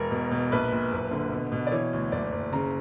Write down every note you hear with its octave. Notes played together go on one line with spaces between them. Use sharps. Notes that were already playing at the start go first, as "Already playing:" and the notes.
Already playing: E1 A#4
B2
B2
A#1 B4
A#2
F#1
D3
B2
B2
D5
E3 C#5
D2
F#1 D5
F#1
C#3 A#5